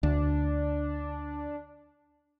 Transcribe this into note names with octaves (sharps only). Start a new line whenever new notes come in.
D2 D4